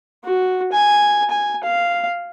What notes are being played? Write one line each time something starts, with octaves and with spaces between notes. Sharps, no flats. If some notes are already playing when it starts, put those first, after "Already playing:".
F#4
G#5
G#5
F5